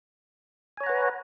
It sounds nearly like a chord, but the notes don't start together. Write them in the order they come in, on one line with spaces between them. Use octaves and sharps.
G#5 C#5 A#5 F#5 B4